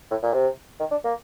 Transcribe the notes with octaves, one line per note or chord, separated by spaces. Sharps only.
A2
A#2
C3
D#3
D4
A#3